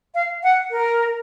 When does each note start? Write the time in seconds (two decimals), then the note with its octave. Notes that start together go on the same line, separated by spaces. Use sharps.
0.15 F5
0.43 F#5
0.71 A#4